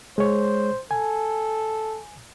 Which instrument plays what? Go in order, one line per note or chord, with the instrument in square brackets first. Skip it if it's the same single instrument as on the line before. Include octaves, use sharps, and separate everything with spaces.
[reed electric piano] G#3 C#5 [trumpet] C5
[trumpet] A4 [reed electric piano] G#5